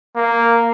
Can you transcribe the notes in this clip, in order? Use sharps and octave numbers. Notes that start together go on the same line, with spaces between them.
A#3